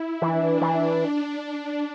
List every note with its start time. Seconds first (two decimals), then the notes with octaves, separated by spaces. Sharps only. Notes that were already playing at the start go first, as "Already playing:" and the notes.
Already playing: E4
0.22 E3 D4
0.61 E3